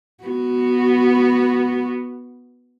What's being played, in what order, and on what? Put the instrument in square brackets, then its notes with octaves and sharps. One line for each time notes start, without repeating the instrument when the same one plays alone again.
[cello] B3 F#4